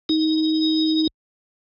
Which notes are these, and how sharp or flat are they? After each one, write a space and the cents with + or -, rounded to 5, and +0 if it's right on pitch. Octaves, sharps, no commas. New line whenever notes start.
D#4 +20